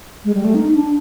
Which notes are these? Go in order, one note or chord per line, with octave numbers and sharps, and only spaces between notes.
G#3
G3
A3
D#4
D4